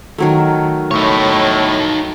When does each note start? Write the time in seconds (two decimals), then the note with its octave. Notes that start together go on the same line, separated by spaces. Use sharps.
0.18 D#3 F#3 A3
0.91 A2 D#4 C#5